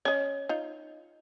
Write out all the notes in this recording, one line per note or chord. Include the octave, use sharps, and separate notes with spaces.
C#4 C#5 D#5
D#4 F4